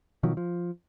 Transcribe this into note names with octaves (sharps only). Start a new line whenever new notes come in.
B2 D#3 F3 F#3
F3